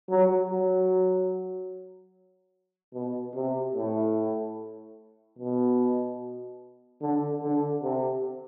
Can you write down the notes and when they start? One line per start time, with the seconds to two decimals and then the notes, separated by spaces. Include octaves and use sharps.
0.09 F#3
0.51 F#3
2.94 B2
3.35 C3
3.76 A2
5.39 B2
7.02 D3
7.43 D3
7.83 C3